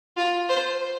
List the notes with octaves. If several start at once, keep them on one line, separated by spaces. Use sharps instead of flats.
F4
C5